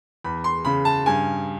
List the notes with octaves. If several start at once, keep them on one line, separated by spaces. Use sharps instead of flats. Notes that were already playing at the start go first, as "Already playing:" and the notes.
E2 B5
C6
C#3 B5
A5
G2 G#5